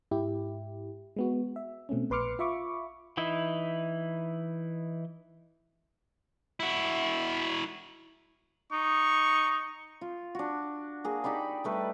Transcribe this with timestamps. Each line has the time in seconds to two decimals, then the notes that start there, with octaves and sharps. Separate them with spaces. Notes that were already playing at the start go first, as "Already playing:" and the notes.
0.11 G#2 E4 G4
1.16 G#3 B3 F#4
1.56 E5
1.89 B2 A3 C4 C#4
2.10 A#1 B4 C6 D6 F6 C#7
2.39 F4 E5 B5 C#6 D6
3.17 E3 D#4 E4
6.60 E4 F#4
8.72 D#4 C#6
10.01 F4
10.35 D4 F#4
11.04 A#3 G#4
11.24 D#4 G4 D5 B5
11.64 G3 A3 B4